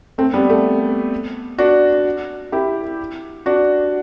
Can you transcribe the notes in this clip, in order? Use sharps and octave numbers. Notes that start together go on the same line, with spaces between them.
A3 C4
G3 B3
A3
D4 F#4
E4 G4
D4 F#4